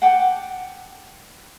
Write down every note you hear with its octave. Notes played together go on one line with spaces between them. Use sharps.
F#5 G5 A5 D6